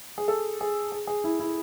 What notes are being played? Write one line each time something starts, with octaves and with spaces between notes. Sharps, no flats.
G#4
A4
G#4
G#4
G#4
E4
E4